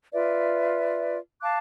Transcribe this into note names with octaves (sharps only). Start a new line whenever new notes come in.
F4 B4 D5 E5
F5 A5 D6 F#6